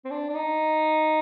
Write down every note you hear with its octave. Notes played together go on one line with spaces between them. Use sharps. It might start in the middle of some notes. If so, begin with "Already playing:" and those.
C4
D4
D4
D#4